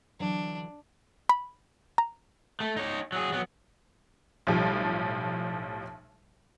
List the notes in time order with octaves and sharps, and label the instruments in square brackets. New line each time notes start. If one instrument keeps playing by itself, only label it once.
[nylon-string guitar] D3 E3 F#3 [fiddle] D4
[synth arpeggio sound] B5
A#5
[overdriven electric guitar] A3
D#4 C#5
F#3 G#4
F#3 B3
[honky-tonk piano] B1 A2 F3 G3